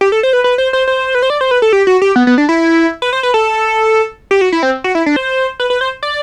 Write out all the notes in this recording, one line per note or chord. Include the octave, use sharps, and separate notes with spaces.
G4
A4
C5
B4
B4
C5
C5
C5
B4
C5
D5
C5
B4
A4
G4
F#4
G4
B3
B3
D4
E4
B4
C5
B4
A4
G4
F#4
E4
C4
F#4
E4
D4
C5
B4
B4
C5
D5